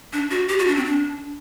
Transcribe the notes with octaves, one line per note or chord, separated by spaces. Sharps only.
D4
F#4
G4
F#4
D4
C4
D4